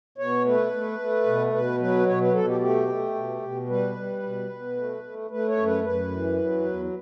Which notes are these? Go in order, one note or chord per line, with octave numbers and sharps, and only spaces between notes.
B2 C#5
A3 B4
A3
A3
B2
B2 B4
F#3 B4
B2 C#5
B4
B2 A4
G4
A3 G4
A3
B2
B2
G3 B4
G3
B2
B2
A3
A3
A3 B4
C#5
F#2
B4
F#2 B4
E3
F#3
E2